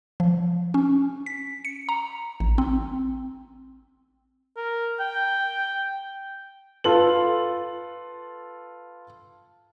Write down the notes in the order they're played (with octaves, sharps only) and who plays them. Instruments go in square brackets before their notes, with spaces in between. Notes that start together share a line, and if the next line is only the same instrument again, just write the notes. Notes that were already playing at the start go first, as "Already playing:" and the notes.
[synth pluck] F3
C#4
B6
C#7
A#5
A1
C4
[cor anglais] A#4
G5
[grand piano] F4 A4 B4 F#7